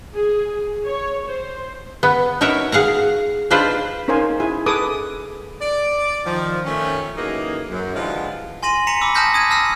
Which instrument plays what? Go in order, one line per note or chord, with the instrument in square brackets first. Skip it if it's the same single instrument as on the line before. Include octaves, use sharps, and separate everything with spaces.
[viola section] G#4
C#5
C5
[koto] B3
D#4 F#4 A#4 C#5 E5
G#4 F5 F#5 A#5
D4 D#4 F4 B4 C5
[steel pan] C#4 D#4 A#4 C5 F5 G#5
E4 G#4 G#5
G#4 A4 B4 D6 D#6
[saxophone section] D5
D#3 F3
D#3 A3 C#4
F#2 A2 E3 A#3 D#4 G#4
F#2
D3 E3 F3 G3 G#3 F4
[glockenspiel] G#5 C6 A#6 D#7 F#7
A#5 B6 C#7 E7
B5 D6 E6
A5 D#6 F6 G6 A#6 B6
D#6 G6 G#6 A#6 D#7
A5 E6 F6 A#6 C7 E7